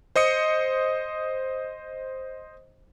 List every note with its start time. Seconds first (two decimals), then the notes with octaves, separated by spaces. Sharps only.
0.16 C5 D#5 D#6 C#7